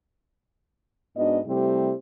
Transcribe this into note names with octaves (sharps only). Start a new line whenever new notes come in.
G#2 B3 D4 F#4 D#5
C3 G3 A3 C4 E4 G4